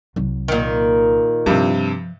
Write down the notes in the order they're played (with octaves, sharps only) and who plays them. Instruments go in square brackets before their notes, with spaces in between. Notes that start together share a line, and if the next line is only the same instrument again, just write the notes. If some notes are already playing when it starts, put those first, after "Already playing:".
[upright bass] C2 F#3
[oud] A#2 D#3
[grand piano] G2 C3 [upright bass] F3